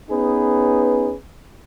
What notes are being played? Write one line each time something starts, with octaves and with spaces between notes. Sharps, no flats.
B3 C#4 D#4 G#4 B4